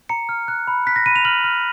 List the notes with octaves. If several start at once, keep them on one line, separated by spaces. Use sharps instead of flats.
A#5 C#7
F6
F#6
B5
F#6 B6
A#6
B5 D#7
F7
F6 F#7
F6